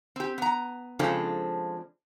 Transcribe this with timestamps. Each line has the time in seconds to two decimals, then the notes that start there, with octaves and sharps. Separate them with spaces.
0.16 C4 G4
0.38 B3 A#5
0.99 C#3 F3 G#3 C4 D4 A4